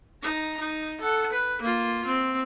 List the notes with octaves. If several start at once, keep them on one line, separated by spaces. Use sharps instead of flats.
D#4 A#5
D#4
A4 F#5
B4
A#3 F4
C4